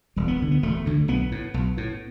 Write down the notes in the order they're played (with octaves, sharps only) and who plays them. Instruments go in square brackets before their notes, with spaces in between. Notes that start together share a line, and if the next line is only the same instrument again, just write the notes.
[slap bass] E1 G3
B3
D2 D3
B3
E1 A3
D2 D3
B1 B3
A2
B1
A2